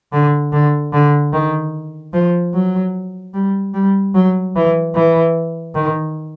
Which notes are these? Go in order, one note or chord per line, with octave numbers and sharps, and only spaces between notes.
D3
D3
D3
D#3
F3
F#3
G3
G3
F#3
E3
E3
D#3